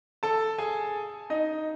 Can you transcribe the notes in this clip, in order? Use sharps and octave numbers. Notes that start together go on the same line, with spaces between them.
A4 A5
G#4 G#5
D#4 D#5